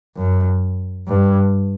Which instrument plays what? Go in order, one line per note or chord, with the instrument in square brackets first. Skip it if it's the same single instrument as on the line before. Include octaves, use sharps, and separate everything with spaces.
[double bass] F#2
G2